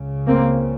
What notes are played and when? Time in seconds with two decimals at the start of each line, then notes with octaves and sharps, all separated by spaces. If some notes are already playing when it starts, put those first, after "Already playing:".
Already playing: C#2 C#3
0.27 A#3 C4